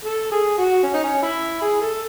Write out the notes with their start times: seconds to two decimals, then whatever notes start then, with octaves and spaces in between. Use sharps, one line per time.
0.04 A4
0.31 G#4
0.58 F#4
0.83 C#4
0.94 D#4
1.04 C#4
1.22 E4
1.61 G#4
1.81 A4